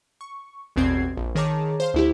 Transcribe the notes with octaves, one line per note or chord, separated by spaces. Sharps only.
C#6
A1 E2 B2 C4 G#6 C7
A#1
D#3 G#4 C#5 A5 A#5 D6
C5 F5 C6
D2 E4 G4